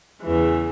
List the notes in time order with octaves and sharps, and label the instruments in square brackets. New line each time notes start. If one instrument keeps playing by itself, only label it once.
[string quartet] E2 C#3 E3